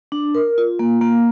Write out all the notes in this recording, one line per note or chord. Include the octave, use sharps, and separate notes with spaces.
D4
A#4
F4
A#3
A#3